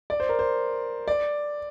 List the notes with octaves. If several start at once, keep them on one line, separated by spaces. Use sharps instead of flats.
D5
C5
A#4
C5
D5